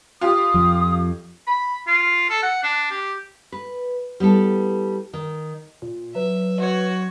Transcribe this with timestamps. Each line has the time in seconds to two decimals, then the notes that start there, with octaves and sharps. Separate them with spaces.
0.21 F4 G4 D#6
0.54 F2 F3
1.47 B5
1.87 F4
2.30 A4
2.43 F#5
2.63 D4
2.91 G4
3.52 B4
4.20 G3 B3 E4 A4
5.13 D#3
5.82 A#2
6.15 F#3 B4 E5
6.60 F#4 C#5